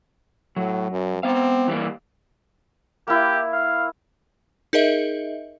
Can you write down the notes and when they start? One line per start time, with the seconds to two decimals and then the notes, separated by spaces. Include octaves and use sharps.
0.56 A2 F#3
0.92 F#2
1.23 B3 C4 F5
1.68 E3 G3 A#3
3.07 A#3 E4 G4
3.52 F5
4.73 D#4 G#4 A#4 D#5 E5